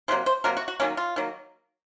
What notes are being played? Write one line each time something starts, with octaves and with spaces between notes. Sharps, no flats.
C3 F#3 A#3 C5
C5
C3 F#3 A#3 A#4
F#4
F#4
D#3 F#3 A#3 C#4
F4
D#3 F#3 A#3